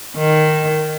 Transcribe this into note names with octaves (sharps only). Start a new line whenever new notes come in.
D#3